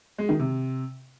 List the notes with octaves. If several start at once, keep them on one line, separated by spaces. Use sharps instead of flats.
G#3
D#3
C3